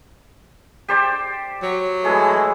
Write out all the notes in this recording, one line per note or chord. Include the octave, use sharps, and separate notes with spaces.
G4 C5 D5
F#3
E3 G#3 A3 G#4